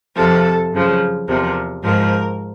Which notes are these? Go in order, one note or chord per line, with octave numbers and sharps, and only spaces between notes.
F2 C3 F3 A4
F#2 C#3 F3
E2 C3 F3 A#4
G#2 F3 A#4